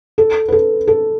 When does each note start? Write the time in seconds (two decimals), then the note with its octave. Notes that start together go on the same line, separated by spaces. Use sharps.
0.18 A4
0.48 B4
0.52 A4
0.88 A4